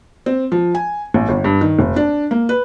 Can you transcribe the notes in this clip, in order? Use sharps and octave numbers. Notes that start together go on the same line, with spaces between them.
C4
F3
G#5
A1
G1
G2
D#3
F1
D4
A#3
B4